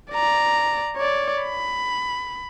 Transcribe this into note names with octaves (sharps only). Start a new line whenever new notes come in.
D5 A#5
C#5 D5
B5